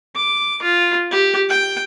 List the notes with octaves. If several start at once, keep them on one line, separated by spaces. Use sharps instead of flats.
D6
F4
G4
G5